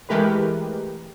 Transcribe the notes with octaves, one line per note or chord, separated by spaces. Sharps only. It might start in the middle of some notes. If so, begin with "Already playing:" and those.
E3 G#3 A3 G4 A#4 B4